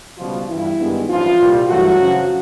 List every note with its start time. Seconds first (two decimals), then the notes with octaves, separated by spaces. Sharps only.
0.18 C#2 B2 F3 G3 F4
0.48 G1 G2 E3 E4
0.78 G2 D#3 G#3 B3 D#4
1.08 A1 G2 E3 F3 F4
1.38 C2 A#2 G3
1.68 G2 E3 F#3 A3 F#4
1.99 F#2 C#3 F3